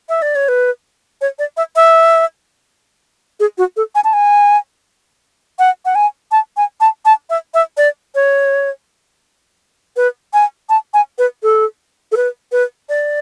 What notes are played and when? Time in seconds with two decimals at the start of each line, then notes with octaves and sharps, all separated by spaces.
0.09 E5
0.22 D5
0.36 C#5
0.48 B4
1.21 C#5
1.39 D5
1.57 E5
1.76 E5
3.40 G#4
3.58 F#4
3.77 A4
3.95 G#5
4.04 A5
4.13 G#5
5.59 F#5
5.85 F#5
5.95 G#5
6.32 A5
6.57 G#5
6.81 A5
7.05 A5
7.30 E5
7.54 E5
7.77 D5
8.15 C#5
9.97 B4
10.34 G#5
10.69 A5
10.94 G#5
11.18 B4
11.43 A4
12.12 A4
12.17 B4
12.52 B4
12.89 D5